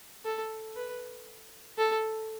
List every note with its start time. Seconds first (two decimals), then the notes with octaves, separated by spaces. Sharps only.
0.25 A4
0.76 B4
1.78 A4